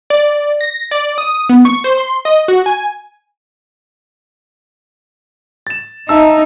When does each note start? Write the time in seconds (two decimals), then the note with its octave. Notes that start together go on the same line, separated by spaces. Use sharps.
0.10 D5
0.61 A#6
0.91 D5
1.18 D#6
1.49 B3
1.65 C#6
1.84 C5
1.97 C6
2.25 D#5
2.48 F#4
2.66 G#5
5.67 A6 E7
6.09 D#4 E5 A5 E6